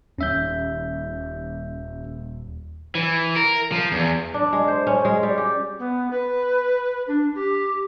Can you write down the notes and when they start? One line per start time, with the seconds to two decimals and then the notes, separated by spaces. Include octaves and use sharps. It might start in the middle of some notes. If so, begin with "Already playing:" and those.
0.18 D#1 D#2 G3 C#4 E5 G6
2.95 E3
3.36 A#4
3.72 F3
3.92 E2
4.34 D4
4.53 G#3
4.68 C5
4.87 C#4
5.05 G#3
5.23 G3
5.38 G4
5.79 B3
6.10 B4
7.07 D4
7.34 G4